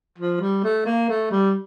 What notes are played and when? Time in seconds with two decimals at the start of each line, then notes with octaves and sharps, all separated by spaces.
0.18 F3
0.40 G3
0.64 A3
0.86 A#3
1.09 A3
1.31 G3